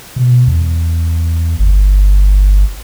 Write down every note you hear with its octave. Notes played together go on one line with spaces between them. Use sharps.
B2
E2
G1